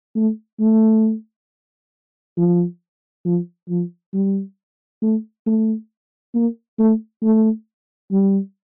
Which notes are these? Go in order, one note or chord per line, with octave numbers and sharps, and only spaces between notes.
A3
A3
F3
F3
F3
G3
A3
A3
A#3
A3
A3
G3